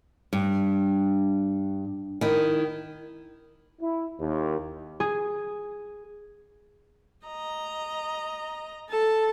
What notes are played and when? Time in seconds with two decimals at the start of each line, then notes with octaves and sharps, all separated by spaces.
0.33 G2
2.21 D#3 E4
3.81 E4
4.20 D#2
5.00 G#4
7.27 D#5 A#5
8.89 A4 A5